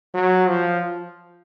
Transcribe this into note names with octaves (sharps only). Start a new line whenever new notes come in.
F#3
F3